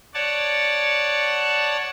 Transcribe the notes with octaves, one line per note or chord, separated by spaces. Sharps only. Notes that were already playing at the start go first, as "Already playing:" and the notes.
C#5 D5 F#5 A5